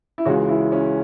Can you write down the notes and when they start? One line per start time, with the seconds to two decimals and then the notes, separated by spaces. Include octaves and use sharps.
0.18 E4
0.25 C#2 C#3 E3 G#3 C#4 F#4
0.49 E4
0.72 C#4